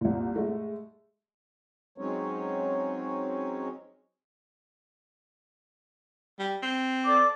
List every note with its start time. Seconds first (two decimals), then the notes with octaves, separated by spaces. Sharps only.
0.01 C2 A#2
0.36 G#3 A3
1.98 F#3 G#3 C4 C#4 D#4 C#5
6.39 G3
6.63 C4
7.04 A4 D5 D6